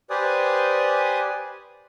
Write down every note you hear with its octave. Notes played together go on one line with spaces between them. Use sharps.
G4 B4 C5 D5 G#5 D#6